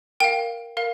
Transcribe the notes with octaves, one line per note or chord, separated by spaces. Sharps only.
A#4 F5 G5
A#4 F5